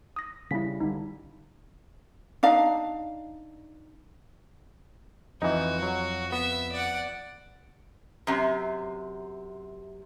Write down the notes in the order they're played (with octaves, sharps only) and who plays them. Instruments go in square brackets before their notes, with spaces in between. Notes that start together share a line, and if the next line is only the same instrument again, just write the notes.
[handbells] D#6 A#6
[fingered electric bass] C#3 G3 [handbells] E4 B6
[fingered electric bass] B1 D3 G3 [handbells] D#4
[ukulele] D4 D#4 F5
[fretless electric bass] F2 [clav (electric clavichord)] E3 D#4 [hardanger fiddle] F#4
[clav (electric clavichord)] F#3
[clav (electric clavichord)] B3 [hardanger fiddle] E5
[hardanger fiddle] D5 F#5
[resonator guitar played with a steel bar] F#2 C3